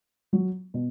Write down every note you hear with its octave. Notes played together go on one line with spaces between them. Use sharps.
F#3
B2